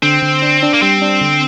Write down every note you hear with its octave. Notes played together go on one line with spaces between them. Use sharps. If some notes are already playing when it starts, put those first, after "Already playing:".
D3 C4
D3
D4
D4
A#3
G3 C4
D4
D3